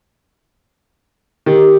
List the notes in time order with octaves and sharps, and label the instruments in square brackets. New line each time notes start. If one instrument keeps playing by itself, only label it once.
[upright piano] D#3 [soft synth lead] G4